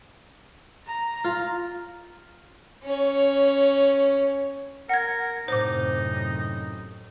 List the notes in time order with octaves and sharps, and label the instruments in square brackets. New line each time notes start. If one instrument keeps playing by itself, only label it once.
[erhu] A#5
[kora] F4
[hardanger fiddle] C#4 C#5
[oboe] A#4 [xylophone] F#5 G#6
[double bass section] F#2 A2 C3 [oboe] D#4 [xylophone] C5 D6